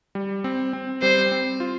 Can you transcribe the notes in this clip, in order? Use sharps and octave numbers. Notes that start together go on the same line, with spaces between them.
G3
C4
C4
G3 C5
C4
F4